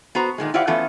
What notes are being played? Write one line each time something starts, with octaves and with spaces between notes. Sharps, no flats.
B3 F#4 C5 A#5
A#2 D#3 G#3
E4 F4 G4 C5 D5 F#5
E3 A3 B3 C#4 F4